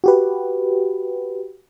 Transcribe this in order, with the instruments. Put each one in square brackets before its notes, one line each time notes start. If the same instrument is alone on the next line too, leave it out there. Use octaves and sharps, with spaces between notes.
[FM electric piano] F#4 G4 B4